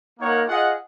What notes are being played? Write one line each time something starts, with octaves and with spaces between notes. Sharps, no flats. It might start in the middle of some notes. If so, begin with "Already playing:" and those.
A#3 D#4 A#4 C#5 F#5
F4 G#4 D#5 F#5